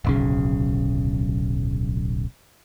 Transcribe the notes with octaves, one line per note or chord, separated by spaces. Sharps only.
D1 B1 C#3